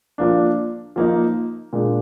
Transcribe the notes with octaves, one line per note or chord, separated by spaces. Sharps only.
F3 A#3 D4
F3 A#3 D#4
A#2 G#3 D4